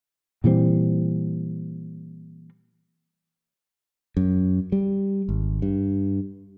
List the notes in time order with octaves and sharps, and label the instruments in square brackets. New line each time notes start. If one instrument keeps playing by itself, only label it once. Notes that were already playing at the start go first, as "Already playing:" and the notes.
[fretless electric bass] A#2 E3 G3 C4
[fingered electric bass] F#2
G3
G#1
G2